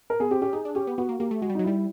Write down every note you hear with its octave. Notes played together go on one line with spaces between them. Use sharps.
A#4
B3 G#4
C4 G4
C#4 G4
D#4 G#4
D4
C#4 G4
B3
B3 F#4
A#3
A#3 G4
A3
G#3 F#4
G3
D#4
F#3
G3 E4